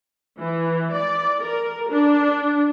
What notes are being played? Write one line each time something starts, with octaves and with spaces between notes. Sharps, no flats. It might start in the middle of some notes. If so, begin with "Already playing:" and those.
E3
D5
A#4
D4